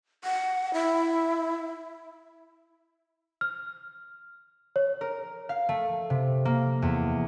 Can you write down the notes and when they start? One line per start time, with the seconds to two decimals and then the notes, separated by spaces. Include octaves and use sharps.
0.24 F#5
0.74 E4
3.41 F6
4.76 C#5
5.01 A#4
5.49 F5
5.69 A3
6.10 C3
6.45 A#3
6.82 E2